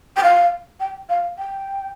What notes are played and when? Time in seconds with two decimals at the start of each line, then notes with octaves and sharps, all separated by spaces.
0.17 G5
0.23 F5
0.80 G5
1.09 F5
1.38 G5